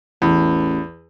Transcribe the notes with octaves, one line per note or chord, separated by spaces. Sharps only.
A1 E2